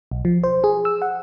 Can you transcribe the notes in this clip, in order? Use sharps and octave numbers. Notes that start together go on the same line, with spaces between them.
B1
F3
C5
G#4
E6
F#5